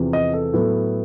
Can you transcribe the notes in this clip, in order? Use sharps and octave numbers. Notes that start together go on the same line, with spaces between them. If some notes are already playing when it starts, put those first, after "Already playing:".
Already playing: E2 C3 F3
D#5
A4
A2 F#3 B3